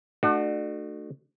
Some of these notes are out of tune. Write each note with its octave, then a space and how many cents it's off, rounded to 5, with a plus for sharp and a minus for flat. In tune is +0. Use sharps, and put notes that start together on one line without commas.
A3 +0 D4 +40 F#4 +0